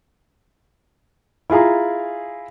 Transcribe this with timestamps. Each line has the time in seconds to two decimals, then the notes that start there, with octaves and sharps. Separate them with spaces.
1.50 E4 F4 G#4 A#5